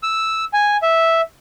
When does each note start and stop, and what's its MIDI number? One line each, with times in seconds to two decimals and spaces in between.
0.03 0.45 88
0.53 0.77 80
0.82 1.21 76